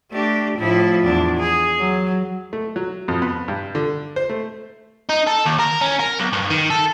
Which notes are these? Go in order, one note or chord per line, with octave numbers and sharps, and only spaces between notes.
A3 D4 G4
A2 F3 E4
E2 D4
G#4
F#3
A3
F#3
F2
B3
G2
D3
C5
A3
D#4
A4
D#2
A#4
C#4
A#4
B1
G2
D#3
A4